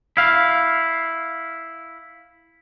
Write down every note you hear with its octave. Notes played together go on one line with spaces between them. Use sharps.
E4 F5